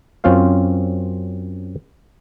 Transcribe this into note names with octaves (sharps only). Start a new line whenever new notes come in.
F#2 C4 C#4 F4 C5 F5